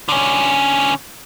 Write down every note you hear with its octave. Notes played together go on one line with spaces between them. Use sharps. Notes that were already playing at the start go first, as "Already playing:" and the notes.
D3 C#4